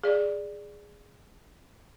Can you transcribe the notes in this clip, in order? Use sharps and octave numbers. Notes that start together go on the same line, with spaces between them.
G#4 D5